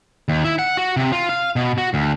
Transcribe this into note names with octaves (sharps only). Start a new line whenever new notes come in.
D#2
E4
F#5
F#4
C3
F4
F5
B2
F#4
D2